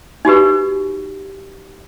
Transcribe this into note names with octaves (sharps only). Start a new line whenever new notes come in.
D#4 F#4 G4 B4